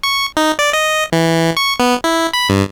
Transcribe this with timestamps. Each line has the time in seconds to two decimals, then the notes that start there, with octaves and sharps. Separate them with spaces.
0.03 C#6
0.37 D#4
0.59 D5
0.73 D#5
1.12 E3
1.57 C#6
1.80 B3
2.04 E4
2.33 B5
2.49 G2